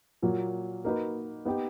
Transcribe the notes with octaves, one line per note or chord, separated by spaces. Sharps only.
A#2 F#3 A#3
A#3 D#4 F#4 B4
B3 D#4 G4